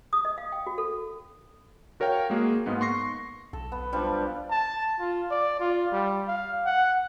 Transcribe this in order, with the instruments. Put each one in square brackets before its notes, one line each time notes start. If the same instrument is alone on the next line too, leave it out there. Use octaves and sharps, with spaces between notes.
[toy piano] D#6
D#5
F5
G5
F#4
A4
[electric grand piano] F#4 A#4 C#5 F5 G5
G#3 A#3 F#4 G#4
G#2 G#3 A#3 B3
C6 C#6 A#6 C7
[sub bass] B1 [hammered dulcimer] A4
[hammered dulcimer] B3
F3 G3 D4
[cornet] A5
F4
D5
F4
G3
F5
F#5